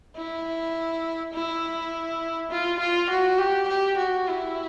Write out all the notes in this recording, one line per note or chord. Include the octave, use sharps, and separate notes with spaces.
E4
E4
F4
F4
F#4
G4
G4
F#4
E4